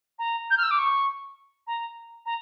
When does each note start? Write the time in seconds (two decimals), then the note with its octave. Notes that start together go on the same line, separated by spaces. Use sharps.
0.18 A#5
0.50 G6
0.57 F6
0.63 E6
0.70 D6
0.78 C#6
1.67 A#5
2.25 A#5